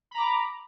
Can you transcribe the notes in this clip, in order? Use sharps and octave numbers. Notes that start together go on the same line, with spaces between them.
A#5 B5 D6